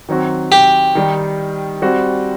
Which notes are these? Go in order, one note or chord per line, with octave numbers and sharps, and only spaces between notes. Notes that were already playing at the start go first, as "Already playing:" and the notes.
D#3 F#3 C4 F#4
G4
D#3 G3 D#4
G3 C4 F#4